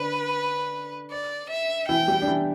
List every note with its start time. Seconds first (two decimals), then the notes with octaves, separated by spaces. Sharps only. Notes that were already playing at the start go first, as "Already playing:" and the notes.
Already playing: D3 D4 B4
1.11 D5
1.50 E5
1.88 E3 E4 G5
2.08 G3 G4
2.22 D4
2.27 E3 E4